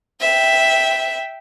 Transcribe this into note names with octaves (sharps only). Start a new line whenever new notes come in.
E5 G5